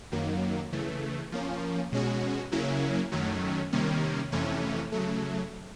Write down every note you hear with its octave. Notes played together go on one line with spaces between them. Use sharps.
F#2 D#3 F#3 A#3
C#3 E3 A3
F3 A#3 C#4
B2 G#3 C#4 F#4
C#3 F#3 A#3 C#4 E4
F#2 D#3 F#3 A3 C#4
C3 D#3 G3 A#3 C#4
F2 C3 E3 A3 C#4
C#3 F#3 A3